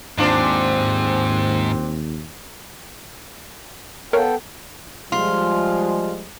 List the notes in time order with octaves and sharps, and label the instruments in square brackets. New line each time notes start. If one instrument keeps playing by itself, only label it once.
[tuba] D#2 [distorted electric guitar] G#2 [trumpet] C4 [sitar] D4 F4 C5
[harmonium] B3 A4 G5 [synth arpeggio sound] A#4 C#5 F5
[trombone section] F3 G3 G#3 [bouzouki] F4